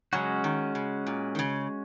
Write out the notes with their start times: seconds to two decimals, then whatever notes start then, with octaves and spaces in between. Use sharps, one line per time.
0.12 C#3 F#3 G#3 C#4 F#4
0.44 D#3
0.75 C#3
1.07 A#2
1.35 D#3
1.39 C#3